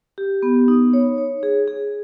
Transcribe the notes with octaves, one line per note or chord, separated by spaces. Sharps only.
G4
B3
D#4
C#5
C#5
G#4
G#4